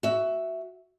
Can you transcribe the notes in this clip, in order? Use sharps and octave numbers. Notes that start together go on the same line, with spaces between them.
F#4 E5